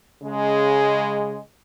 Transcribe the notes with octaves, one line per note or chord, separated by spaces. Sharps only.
C#3 G#3